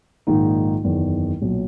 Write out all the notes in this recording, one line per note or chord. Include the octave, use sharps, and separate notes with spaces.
A#1 G#2 D#3 A#3 D#4
F#1 E2 D#3
B1 A#2 F#3